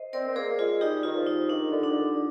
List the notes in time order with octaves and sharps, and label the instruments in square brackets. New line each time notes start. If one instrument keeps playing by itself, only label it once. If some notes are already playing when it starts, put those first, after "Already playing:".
Already playing: [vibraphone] C5 D#5
[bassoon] C4 [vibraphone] A#4 D5
[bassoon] C4
[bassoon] A#3 [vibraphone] G#4 C5
[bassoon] A#3
[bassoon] G#3 [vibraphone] F4 G#4
[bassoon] G3 [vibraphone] D#4 G4
[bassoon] D#3 [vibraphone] F4
[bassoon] F3
[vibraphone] D#4
[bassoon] D#3 [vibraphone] D4
[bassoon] D3
[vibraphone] D4
[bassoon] D#3
D3